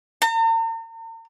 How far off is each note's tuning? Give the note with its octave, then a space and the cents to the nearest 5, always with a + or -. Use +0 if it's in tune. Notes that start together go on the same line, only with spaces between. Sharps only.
A#5 -45